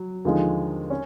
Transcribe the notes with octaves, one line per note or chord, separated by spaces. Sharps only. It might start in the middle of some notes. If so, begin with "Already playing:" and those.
Already playing: F#3
D#2 D3 F3 G#3
C#4